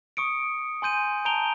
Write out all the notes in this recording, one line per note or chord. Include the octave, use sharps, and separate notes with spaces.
C#6 D#6 C#7 D7
G#5 C6 G6 D#7
A5 A#5 G6 D7 F7 G7